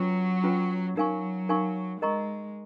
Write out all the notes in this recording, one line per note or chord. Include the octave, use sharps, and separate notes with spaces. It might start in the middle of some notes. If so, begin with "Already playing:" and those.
Already playing: F#3 C#4 F4 B4
C#4 F4 B4
F#3 D#4 A#4 F5 G#5 C#6
D#4 A#4 F5 G#5 C#6
G#3 A#4 D#5 A#5 C#6